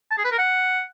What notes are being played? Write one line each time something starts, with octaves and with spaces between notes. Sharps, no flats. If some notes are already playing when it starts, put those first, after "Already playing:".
A5
G#4
B4
A#4
F#5